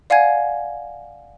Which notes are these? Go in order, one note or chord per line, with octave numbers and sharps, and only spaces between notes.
D5 F5 F#5 G#5 G#6